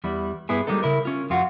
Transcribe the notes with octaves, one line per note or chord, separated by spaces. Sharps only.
E2 G3 E4
G2 B3 E4 G#4
G3 G#3 A#3 D#4 A4
C#3 E4 A#4
C#4 F4
F2 F4 F#4